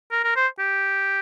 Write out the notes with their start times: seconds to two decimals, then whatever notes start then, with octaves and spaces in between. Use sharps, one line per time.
0.11 A#4
0.24 A#4
0.36 C5
0.59 G4